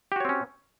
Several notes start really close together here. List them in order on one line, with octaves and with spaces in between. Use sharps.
G4 F#4 C#5 C4 C#4